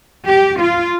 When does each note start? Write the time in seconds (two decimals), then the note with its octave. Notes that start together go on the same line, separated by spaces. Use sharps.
0.25 G4
0.59 F4